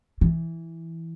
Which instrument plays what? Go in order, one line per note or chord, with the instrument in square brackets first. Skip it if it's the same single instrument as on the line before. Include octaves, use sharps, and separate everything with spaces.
[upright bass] E3